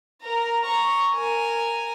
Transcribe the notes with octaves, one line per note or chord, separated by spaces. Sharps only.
A#4 A#5
A#5 C#6
A#4 G#5